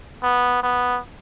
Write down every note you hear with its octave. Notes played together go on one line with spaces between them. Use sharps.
B3
B3